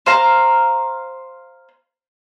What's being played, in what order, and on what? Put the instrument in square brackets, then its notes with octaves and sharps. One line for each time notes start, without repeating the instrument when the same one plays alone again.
[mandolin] C5 F5 A#5